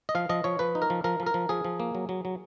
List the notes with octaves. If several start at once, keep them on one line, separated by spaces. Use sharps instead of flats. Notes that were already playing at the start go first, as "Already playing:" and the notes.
D#5
F3 F5
F3 D#5
F3 C#5
F3 B4
D#4
A#4
F3
F3 A#4
F3
A#4
F3
F3 G#4
F3
A#3
F#3
F#3
F#3